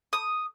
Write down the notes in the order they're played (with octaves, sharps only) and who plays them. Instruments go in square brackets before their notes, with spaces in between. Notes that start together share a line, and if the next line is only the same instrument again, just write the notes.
[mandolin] D#6